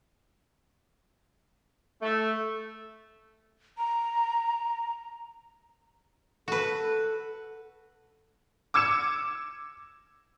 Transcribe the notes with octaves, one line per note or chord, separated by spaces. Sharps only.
A3
A#5
F#4 A4 B4
D6 E6 G#6 C#7 E7